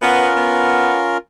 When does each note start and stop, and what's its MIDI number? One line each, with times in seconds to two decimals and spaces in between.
0.02 0.31 59
0.02 1.17 61
0.02 1.17 65
0.02 1.17 70
0.36 1.03 59